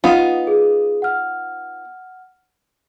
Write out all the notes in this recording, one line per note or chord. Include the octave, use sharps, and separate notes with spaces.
B3 D#4 F4 F#5
G#4
F#5 F6